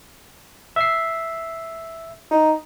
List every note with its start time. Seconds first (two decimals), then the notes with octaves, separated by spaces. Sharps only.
0.76 E5 C7
2.31 D#4